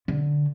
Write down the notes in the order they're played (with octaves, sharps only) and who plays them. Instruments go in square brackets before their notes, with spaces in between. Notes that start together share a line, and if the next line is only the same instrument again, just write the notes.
[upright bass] D3